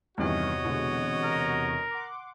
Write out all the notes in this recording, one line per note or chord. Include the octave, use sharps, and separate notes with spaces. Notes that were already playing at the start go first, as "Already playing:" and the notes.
E2 G2 C3 D#3 E3 F#4 C#5 D#5
B2 D3 G#3
A#4
F#5 C6 D6